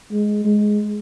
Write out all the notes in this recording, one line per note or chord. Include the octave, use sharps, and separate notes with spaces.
G#3
G#3